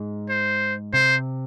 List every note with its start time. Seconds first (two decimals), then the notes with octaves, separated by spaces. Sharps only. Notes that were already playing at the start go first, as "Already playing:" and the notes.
Already playing: G#2
0.29 C5
0.94 C3 C5